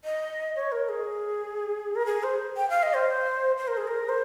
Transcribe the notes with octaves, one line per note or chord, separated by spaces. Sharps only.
D#5
C#5
A#4
G#4
A#4
G#4
C5
G5
F5
D#5
C5
C5
A#4
G#4
A#4
C5